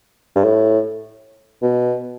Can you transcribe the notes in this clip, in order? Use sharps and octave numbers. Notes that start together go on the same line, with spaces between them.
G2
A2
B2